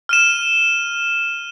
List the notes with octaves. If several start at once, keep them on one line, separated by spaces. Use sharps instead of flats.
F6 D#7 E7